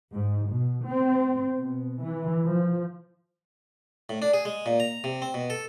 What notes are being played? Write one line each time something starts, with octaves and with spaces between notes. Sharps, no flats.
G#2
B2
C4
B2
E3
F3
A2
D4
G#4
G#3
A#2
A#5
C3
C4
B2
A4